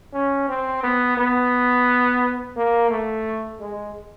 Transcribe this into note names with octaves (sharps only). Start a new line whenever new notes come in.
C#4
C4
B3
B3
A#3
A3
G#3